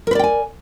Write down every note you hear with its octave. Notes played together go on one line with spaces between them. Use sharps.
A#4 B4 D5 G5 G#5